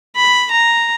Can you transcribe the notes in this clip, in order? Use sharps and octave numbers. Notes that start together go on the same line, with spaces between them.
B5
A#5